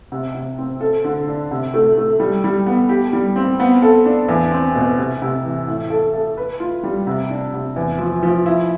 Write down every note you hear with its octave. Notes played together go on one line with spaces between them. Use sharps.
C3
C3
C4
A4
D3
D4
C3
A3
A3
G3
G3
B3
G4
G3
C4
B3
A4
D4
E2
C4
B2
C3
C3
E3
A2
A4
A4
B4
F4
G3
C3
D4
C3
E2
F3
F3
E4